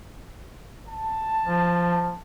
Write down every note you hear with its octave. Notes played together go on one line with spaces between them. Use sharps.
A5
F3